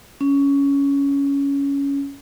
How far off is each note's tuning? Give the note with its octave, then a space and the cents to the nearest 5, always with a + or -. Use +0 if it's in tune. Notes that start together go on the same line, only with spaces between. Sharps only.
C#4 +10